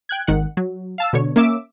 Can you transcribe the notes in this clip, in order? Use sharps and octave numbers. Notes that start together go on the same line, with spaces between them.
G5 F#6 G#6
G#1 D#3 F#5
F#3
F5 A5 E6
B2 D3 C#5
A#3 C#4 E5 D6 E6